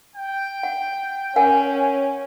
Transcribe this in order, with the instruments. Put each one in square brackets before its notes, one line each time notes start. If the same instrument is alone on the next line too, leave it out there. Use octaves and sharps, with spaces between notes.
[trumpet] G5
[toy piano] F#5
[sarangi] C#4 [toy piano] A#4 F#5 G#5